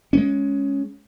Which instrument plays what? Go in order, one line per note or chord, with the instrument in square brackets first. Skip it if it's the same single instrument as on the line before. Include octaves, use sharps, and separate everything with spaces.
[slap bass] G#3 B3 C#4